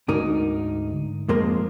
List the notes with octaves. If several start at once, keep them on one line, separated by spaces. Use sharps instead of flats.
D2 G#2 D#4 A#4 D5
F2 G#3 A#3 A#4 C6